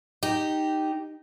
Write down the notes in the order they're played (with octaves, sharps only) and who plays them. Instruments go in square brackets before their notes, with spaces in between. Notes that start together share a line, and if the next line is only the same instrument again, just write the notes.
[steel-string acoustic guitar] D#4 G4